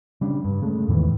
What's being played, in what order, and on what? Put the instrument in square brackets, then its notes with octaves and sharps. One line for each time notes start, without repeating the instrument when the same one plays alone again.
[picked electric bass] C#3 G3 D4
G2
C#3 G#3 A3
E2 A2 D#3 E3